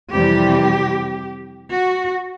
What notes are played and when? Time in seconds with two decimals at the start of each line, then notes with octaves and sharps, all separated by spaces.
0.11 F2 C3 E3 G3 G4
1.72 F#4